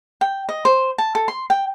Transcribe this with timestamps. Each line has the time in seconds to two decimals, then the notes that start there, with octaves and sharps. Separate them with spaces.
0.21 G5
0.49 D#5
0.65 C5
0.98 A5
1.15 A4
1.28 C6
1.50 G5